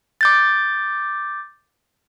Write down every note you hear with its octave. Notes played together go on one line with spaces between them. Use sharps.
D6 G6 A6